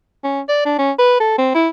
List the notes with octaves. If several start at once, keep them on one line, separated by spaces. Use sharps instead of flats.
C#4
D5
D4
C#4
B4
A4
C4
E4